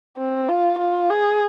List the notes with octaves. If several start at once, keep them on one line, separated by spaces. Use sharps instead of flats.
C4
F4
F4
G#4